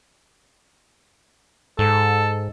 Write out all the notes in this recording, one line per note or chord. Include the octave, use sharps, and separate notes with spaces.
G#2 A4